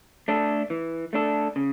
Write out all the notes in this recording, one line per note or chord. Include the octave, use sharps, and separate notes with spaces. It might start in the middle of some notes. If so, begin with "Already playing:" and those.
A3 D4 A4
E3
A3 D4 A4
C#3